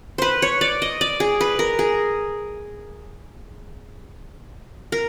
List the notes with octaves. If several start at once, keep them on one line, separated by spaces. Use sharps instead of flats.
B4 C5
C#5
D5
D#5
D5
G#4
B4
A#4
G#4
A#4